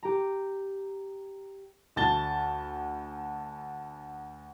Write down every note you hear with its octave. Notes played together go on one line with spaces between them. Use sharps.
G4 A#5
D2 A5 A6 G7